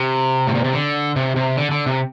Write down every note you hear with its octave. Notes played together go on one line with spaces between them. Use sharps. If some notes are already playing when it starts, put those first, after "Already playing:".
Already playing: C3
A2
A#2
C3
D3
C3
C3
D3
D3
C3